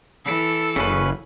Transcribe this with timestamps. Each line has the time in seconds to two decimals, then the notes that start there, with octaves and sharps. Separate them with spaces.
0.25 E3 A4
0.76 F#1 C#3 C#4 B4